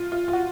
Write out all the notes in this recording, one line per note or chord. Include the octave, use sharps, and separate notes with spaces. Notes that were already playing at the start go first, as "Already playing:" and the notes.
Already playing: F4
F4
F4
F#4